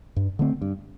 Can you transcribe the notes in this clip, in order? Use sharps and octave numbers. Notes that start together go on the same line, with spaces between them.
G2
D3 A3 C4
G2